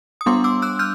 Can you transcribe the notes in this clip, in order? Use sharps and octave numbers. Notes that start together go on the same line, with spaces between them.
D#6
G3 B3 D4 C6 D6
D6 E6
E6 F#6
F6 G6